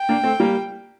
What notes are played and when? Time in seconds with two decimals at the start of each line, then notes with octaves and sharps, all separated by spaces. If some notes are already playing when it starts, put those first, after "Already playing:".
Already playing: G5
0.09 A#3 D4
0.24 A3 C4
0.40 G3 A#3